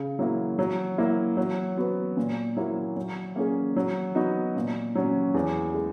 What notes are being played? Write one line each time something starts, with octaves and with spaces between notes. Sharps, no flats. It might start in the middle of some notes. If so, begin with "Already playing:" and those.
Already playing: C#3
F#3 A#3 E4
F#3
A#3 E4
F#3
B3 F#4 B4
A#2
F#3 A#3 E4
F#3
A#3 C#4 G#4
F#3
B3 D#4 F#4
A#2
F#3 C#4
E2
G#3